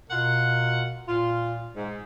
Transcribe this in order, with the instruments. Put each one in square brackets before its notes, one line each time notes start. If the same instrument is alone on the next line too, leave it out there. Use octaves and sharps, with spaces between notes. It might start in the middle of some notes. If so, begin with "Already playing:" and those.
[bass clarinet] B2 [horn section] F4 A#4 F#5
[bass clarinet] A#2 [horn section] F4
[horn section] G#2